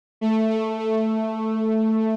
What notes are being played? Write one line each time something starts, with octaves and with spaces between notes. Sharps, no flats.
A3
A3
A3